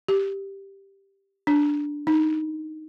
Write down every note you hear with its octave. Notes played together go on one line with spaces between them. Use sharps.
G4
D4
D#4